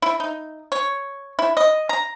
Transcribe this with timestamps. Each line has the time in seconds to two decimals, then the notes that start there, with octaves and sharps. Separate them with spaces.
0.02 E4
0.20 D#4
0.72 C#5
1.39 E4
1.57 D#5
1.89 A#5